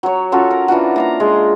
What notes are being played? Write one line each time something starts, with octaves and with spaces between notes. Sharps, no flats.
F#3 C#5
C#4 F4 F#4 A4
A#4
E3 D4 F4 F#4
A#3 F5 A#5
G#3 F4